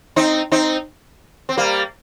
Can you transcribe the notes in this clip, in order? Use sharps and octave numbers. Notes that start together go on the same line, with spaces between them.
C4 D#4
C4 D#4
C4
G3 A#3